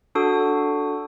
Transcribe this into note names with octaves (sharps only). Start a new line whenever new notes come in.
D4 F#4 A4 D#6 G6